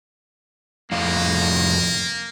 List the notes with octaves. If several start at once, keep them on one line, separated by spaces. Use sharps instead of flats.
F2 A2 A#3 F5